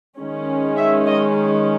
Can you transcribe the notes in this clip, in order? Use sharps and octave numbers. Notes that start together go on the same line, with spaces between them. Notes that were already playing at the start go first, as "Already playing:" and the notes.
D#3 G#3 C#4
E5
D#5